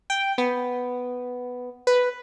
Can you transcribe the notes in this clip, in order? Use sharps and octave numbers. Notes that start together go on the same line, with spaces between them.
G5
B3
B4